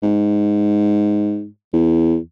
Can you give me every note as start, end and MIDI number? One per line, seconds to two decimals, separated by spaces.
0.03 1.46 44
1.74 2.17 40